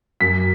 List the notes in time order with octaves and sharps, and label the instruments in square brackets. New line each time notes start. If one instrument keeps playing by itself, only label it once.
[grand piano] F#2 B6